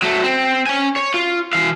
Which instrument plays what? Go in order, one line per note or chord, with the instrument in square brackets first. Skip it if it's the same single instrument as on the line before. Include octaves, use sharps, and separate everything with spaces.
[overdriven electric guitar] F#3 A3
C4
C#4 G#5
C#5
F4
E3 F5